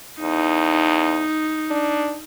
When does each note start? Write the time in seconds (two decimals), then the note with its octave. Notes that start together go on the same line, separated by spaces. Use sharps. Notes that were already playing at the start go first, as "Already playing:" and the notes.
0.21 E2 D#4
1.70 D4